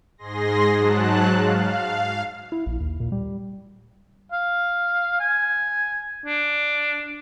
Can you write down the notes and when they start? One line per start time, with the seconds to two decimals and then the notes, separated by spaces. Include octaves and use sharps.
0.18 G#2 G#4 C6 A#6
0.75 G#2 F#3 A5 F#6
1.36 F5
2.52 E4
2.66 A#1
2.80 D#2
3.00 A#2
3.12 G3
4.32 F5
5.20 G#5
6.26 D4